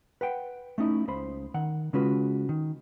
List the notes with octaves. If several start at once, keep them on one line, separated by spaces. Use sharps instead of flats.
B4 F#5 G5
A3 C#4 D#4 E4
C#2 C#3 C5 B5
D#3 F#5
C#3 G#3 C#4 F4 F#4 B4
D#3